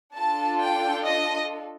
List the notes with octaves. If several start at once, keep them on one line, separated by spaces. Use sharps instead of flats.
D4 F4 A4 A5
G5
D#5